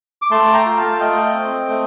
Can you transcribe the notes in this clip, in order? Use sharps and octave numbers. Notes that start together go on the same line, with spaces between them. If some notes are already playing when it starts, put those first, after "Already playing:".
D6
A3 A5 C6
G5 A#5
F4
F5 A5
A3 D#5 G5
C4
A3